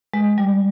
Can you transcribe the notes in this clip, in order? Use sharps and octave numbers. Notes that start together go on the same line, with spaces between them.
G#3
G3